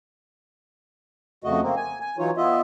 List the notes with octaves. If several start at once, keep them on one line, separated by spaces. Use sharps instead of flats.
F2 C#3 A3 F#4 D#5
A#3 C4
G#5
G#5
E3 F#3 D#4 F4 C#5
B3 F4 D#5 E5